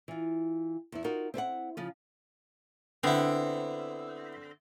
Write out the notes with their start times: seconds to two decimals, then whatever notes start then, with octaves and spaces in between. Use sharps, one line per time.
0.08 E3 F4
0.92 E2 E4
1.04 D#4 F4 F#4 A#4
1.34 C4 E4 B4 F#5
1.77 C#3 F3 F4
3.03 D3 B3 C4 E4